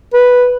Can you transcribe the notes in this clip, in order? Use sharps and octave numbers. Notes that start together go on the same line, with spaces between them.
B4